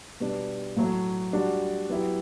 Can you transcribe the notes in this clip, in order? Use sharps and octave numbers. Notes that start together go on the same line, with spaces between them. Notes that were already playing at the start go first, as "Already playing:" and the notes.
B2 G3 D4
A2 F#3 A3
G3 D4 F#4
F#3 B3 E4 G4